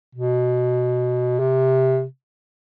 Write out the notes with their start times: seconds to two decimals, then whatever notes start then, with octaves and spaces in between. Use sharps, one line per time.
0.15 B2
1.39 C3